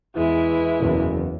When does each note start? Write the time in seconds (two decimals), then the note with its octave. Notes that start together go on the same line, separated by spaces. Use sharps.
0.16 E2 E3 G#3 E4
0.79 F#1 E2